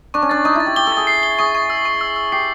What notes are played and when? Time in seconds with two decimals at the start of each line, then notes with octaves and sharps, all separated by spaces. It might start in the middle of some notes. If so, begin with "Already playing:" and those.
0.14 D4 C#6
0.22 C#4
0.29 D4 A6
0.45 D#4 C#6
0.55 E4 A6
0.66 G4
0.76 G4 G7
0.87 A4
0.92 G#4 A6
1.07 C7
1.23 G7
1.39 G#4 C#6
1.55 C#6
1.70 E6
1.85 C#6
2.01 E6
2.16 E6
2.32 G4 C7